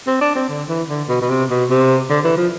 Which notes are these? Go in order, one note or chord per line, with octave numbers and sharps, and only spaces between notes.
C4
D4
C4
D3
E3
D3
B2
B2
C3
B2
C3
D3
E3
F3